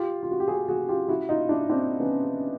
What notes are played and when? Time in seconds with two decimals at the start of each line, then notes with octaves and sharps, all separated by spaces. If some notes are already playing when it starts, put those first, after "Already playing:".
Already playing: F4 G4
0.23 F4
0.31 F#4
0.40 G4
0.48 F#4 G#4
0.68 F#4 G#4
0.89 F4 G4
1.08 E4 F#4
1.29 D#4 F4
1.49 D4 E4
1.69 C4 D4
2.00 B3 C#4